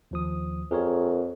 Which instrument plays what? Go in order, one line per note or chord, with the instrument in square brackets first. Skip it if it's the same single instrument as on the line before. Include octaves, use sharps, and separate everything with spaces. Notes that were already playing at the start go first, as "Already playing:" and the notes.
[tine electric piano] D#2 F3 D#6
[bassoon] F2 [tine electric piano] G#4 A#4 C#5